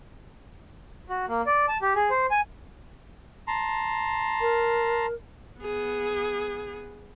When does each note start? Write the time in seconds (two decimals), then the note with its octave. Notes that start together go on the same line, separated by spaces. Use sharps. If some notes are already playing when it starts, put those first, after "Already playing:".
1.10 F#4
1.28 A#3
1.46 D5
1.68 A5
1.82 G4
1.96 G#4
2.10 C5
2.31 G#5
3.48 A5 A#5 C6
4.41 A#4
5.59 B3 G#4